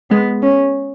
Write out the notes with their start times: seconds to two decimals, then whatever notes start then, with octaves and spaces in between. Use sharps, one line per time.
0.10 G#3 B3
0.42 C#4